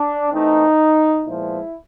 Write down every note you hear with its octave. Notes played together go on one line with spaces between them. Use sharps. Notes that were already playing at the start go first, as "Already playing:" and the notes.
Already playing: D4
E3 A3 C4 D#4
A#2 F3 G#3 B3 E4